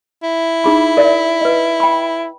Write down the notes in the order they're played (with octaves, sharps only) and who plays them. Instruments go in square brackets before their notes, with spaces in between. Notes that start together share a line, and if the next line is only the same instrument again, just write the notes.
[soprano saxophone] E4
[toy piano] D#4 G#4 B5
A#4 D5 E5
B4 D#5
G5 B5